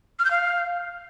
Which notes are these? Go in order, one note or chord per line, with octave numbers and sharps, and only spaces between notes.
F6
G6
F5